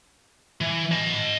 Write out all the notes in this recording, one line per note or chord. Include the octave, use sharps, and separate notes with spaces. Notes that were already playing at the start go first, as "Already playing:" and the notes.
E3
D#5 A5